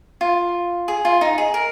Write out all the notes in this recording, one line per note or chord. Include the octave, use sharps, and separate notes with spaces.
F4
G#4
F4
D#4
G#4
A#4